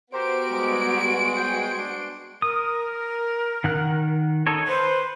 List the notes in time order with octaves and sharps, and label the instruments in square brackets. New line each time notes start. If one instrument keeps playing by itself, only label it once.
[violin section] B3 F#4 D7 [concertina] G4 A#4 [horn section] C5
[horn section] G3 G#3
[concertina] C5 G5 G#5
D4 C6
[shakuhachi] A#4 [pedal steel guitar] D#6
[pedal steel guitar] D#3 F#5 F#6
D#4 A4 C#5
[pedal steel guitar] B4 [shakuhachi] C5